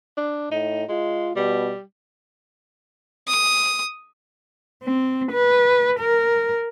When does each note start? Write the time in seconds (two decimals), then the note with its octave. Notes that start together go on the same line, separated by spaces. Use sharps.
0.17 D4
0.51 A2 D#4
0.89 G#3 F4
1.36 B2 G3
3.27 D#6
4.84 C4
5.32 B4
5.99 A#4